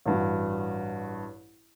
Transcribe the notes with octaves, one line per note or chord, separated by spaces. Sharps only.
A1 G2 F#4